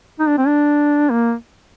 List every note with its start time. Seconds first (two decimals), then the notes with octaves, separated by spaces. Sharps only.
0.19 D#4
0.28 D4
0.38 C4
0.47 D4
1.10 A#3